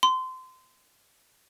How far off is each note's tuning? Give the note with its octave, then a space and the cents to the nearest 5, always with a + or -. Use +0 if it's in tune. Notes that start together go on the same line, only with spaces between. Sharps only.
C6 -25